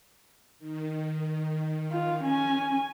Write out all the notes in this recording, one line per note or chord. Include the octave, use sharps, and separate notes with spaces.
D#3
F4
C#4 G#5